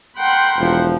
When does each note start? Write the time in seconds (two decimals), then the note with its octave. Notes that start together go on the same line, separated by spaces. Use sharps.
0.18 A#4 F#5 G5 B5 C6
0.58 E1 F3